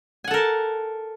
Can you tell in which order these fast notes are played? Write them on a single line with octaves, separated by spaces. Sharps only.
G#5 F#5 A4 A#4 A5